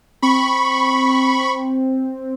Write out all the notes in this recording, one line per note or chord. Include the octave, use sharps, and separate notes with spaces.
C4 B5 C#6